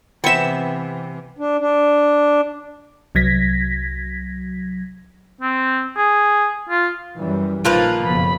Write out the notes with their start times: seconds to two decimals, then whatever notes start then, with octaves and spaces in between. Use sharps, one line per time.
0.24 C3 E3 B3 C4 E5 C#7 E7
1.38 D4
1.60 D4
3.15 C2 F#3 G#6 A#6 B6
5.41 C4
5.97 G#4
6.69 F4
7.17 F#2 E3 G3
7.65 A#1 D#3 F3 A#3 F4 B4 F#6
8.02 F#1 F2 B2 B5